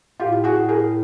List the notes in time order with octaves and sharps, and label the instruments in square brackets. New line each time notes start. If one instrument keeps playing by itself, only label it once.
[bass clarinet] A2 [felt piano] F4 G4
[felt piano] F#4 G#4
G#4 A#4